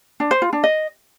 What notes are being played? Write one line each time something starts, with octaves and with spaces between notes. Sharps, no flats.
D4
C5
F4
D4
D#5